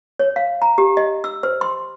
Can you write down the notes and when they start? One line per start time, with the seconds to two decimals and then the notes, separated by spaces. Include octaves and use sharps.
0.19 C#5
0.36 F5
0.62 A#5
0.78 G4
0.97 D#5
1.24 E6
1.43 C5
1.61 C6